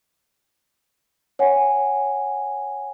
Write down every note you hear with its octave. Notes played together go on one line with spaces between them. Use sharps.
C#5 F#5 G#5